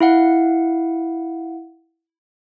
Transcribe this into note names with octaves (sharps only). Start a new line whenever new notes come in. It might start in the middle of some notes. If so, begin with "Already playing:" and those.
E4 F5 F#5